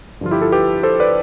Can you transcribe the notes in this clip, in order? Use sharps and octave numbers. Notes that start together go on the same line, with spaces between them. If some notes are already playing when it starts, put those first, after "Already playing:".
G2 D3 F3 F4
E4 G4
F4 A4
G4 B4
A4 C5
B4 D5